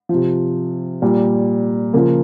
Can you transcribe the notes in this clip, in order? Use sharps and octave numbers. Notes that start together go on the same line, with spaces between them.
C3 F3
A#2 G3
C#3 F3 A#3